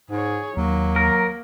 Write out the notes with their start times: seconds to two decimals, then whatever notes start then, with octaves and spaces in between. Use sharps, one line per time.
0.11 G#2 G#4 C#5
0.57 D#2 F#3 A#3
0.96 A#4